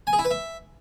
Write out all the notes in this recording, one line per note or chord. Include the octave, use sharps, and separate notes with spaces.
G#5
G#4
E4
B4
E5